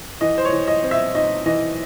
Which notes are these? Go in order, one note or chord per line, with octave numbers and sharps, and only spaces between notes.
E3 D#5
C5
C#5
E3
D#5
C4
E5
D#4 D#5
E3 D#5